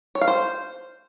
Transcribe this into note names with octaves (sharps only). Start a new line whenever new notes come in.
C#5
F5
C5